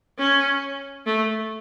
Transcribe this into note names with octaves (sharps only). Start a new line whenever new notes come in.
C#4
A3